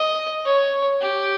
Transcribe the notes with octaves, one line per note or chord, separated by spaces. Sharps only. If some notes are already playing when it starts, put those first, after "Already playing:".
Already playing: D#5
C#5
G4